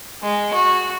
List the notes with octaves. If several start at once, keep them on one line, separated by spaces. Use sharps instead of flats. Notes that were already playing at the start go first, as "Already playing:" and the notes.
G#3
F#4